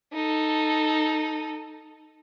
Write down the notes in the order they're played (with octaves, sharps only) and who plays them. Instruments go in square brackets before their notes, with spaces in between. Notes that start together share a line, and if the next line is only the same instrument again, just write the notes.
[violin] D#4 A4